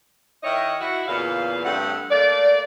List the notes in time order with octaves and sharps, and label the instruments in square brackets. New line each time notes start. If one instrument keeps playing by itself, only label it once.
[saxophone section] D#3 E4 C#5 D#5
E4 F#4
E2 A#2 C#3 B4 F5
G2 A3 C4 F#5
A3 A#3 D5